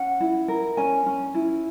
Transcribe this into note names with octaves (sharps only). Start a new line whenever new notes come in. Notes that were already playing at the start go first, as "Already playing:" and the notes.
Already playing: C#4 F#5
E4
A#4
C#4 G#5
C#4
E4